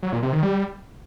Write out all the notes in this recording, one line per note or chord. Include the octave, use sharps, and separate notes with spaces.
F#3
A#2
C3
D#3
G3